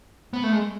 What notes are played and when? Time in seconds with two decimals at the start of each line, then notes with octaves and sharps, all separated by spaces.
0.33 B3
0.43 A3
0.52 G#3